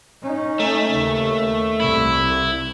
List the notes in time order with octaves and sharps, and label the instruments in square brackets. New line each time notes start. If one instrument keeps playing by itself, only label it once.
[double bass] C#4 D#4
[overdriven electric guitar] A3
[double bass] D#2 C#3
[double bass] C2 [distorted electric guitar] E4